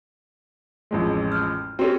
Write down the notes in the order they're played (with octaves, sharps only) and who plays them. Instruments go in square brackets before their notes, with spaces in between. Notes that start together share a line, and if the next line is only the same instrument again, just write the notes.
[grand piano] A1 F2 G#3
[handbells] F6 G6
[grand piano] C4 C#4 [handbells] F#4 G4 A4